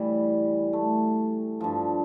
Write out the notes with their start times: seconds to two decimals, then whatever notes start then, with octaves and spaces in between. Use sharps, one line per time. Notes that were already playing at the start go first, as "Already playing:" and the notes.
Already playing: A2 E3 G3
0.73 A3
1.61 G2 F3